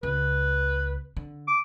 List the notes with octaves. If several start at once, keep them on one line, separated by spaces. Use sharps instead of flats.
C#2 B4
D3
D6